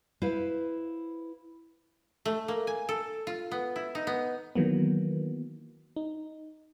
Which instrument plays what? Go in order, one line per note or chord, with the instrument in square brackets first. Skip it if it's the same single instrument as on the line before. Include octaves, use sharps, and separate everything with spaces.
[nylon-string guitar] E4 B4 C5 F5
[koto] A3
A#3
G#5
A4
F4
B3
E4
D#4
B3
[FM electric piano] D#3 E3 F#3 A#3 B3
D#4